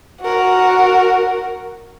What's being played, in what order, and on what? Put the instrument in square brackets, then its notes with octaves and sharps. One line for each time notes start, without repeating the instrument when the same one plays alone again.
[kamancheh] F#4 A#4